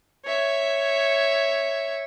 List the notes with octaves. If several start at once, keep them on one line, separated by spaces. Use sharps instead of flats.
C#5 E5